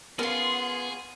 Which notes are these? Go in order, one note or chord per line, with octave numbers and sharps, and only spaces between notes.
B3 C#4 F4 G#4 A#4 F#5 C6